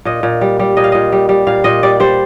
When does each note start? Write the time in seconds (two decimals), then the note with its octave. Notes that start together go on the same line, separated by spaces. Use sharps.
0.05 A#2 D#5
0.23 A#2
0.41 G3
0.60 G3
0.77 A#2 D#5
0.84 F5
0.92 A#2 D#5
1.12 G3
1.29 G3
1.47 A#2 F5
1.64 A#2 D#5
1.83 G3 D5
2.00 G3 C5